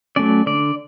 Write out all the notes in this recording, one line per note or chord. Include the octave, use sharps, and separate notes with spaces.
F#3 A3 C#4 D5
D3 D5